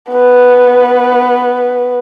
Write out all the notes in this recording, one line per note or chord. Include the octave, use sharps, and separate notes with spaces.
B3 B4